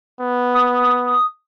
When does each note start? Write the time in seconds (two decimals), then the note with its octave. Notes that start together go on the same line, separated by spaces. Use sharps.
0.21 B3
0.54 D#6